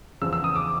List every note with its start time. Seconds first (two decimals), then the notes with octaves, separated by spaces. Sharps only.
0.21 E2 C#3 F3 E6
0.33 E6
0.44 D#6
0.56 D6